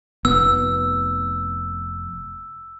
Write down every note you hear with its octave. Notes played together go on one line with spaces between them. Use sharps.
F1 B3 E6